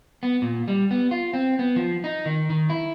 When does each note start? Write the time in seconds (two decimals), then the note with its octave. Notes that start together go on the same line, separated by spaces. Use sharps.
0.23 B3
0.42 A#2
0.68 G3
0.91 B3
1.11 F4
1.34 C4
1.59 B3
1.76 F3
2.04 D#4
2.26 D#3
2.50 D#3
2.70 E4